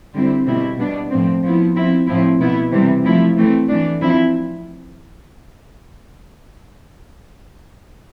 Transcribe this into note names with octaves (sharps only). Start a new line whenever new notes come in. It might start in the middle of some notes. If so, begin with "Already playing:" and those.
D3 G3 C4 E4
B2 G3 C4 E4
B2 G3 B3 D4
A2 F3 C4
F3 B3 E4
F3 C4 E4
A2 F3 C4 E4
B2 B3 E4
C3 E3 G3 C4
F3 A3 E4
E3 A3 C4
E3 A3 D4
F3 C4 E4